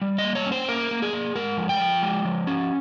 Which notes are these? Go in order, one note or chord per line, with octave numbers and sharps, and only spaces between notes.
G3
D#5
A#3
C#5
C#4
C5
A#3 A#4
A#3
G#4
A#3
G#3 A#4
F3
G5
F3
G#3
F3
C#4